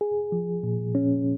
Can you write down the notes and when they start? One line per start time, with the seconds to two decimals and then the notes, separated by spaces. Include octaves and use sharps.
0.01 G#4
0.32 F3
0.63 A#2
0.95 C#4